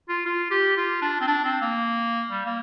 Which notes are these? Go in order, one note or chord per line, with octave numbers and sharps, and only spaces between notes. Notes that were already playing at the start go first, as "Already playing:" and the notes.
F4
F4
G4
F4
D4
C4
D4
C4
A#3
G3
A#3